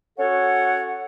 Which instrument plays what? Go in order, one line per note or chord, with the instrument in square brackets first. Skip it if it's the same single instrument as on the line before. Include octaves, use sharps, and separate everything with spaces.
[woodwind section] C#4 F#4 A4 C#5 F#5